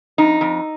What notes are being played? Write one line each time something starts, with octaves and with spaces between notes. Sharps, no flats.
F2 D#4
F2